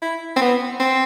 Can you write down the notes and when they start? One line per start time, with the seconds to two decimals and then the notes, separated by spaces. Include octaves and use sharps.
0.02 E4
0.36 C4
0.41 B3
0.80 C4